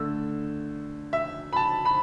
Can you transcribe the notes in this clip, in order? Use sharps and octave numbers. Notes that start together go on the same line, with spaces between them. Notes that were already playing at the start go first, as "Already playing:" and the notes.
Already playing: D3 A3 E6
E5
B5
A5
B5